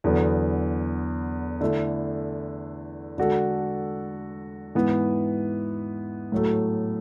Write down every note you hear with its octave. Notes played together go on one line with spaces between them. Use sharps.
E2 D3 F#3 B3
D3 A3 E4
D3 G#3 D4 F#4 A4
G#2 E3 B3
A2 F#3 A3